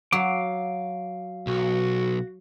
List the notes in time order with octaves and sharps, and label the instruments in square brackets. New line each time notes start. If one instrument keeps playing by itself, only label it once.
[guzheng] F#3 [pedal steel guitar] F5 D6
[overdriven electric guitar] B1 [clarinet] F#4